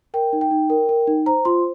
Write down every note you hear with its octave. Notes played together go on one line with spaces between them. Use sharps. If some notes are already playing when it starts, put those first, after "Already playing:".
A#4 G5
D#4
G5
D#4
A#4
A#4
D#4
C5 A#5
F4 C6